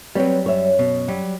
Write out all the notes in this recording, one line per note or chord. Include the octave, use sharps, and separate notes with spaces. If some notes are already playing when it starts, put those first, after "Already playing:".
F#3 G3 B3 C4 C#5
F#2 C#5 E5
B2
F#3 G3